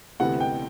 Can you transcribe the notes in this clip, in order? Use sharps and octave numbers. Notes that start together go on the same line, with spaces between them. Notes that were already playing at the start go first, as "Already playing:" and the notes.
D2 C3 E3 B3 F#5
G5